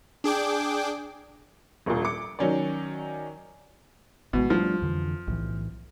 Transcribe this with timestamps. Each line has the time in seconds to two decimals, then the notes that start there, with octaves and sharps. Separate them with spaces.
0.24 D4 G#4 G5 D6
1.86 D#1 A#1 A#2
2.05 D6 C#7
2.39 D#3 F#3 C#4 D5
4.33 G#1 B2 G#3
4.50 F3 G3 A3 D4
4.82 F2 D3 E3
5.28 B1 A2 E3